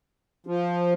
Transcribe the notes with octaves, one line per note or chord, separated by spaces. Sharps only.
F3